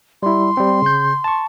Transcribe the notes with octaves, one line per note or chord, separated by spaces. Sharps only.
G3 E4 C6
G3 C4
C#3 G6
A5 C#6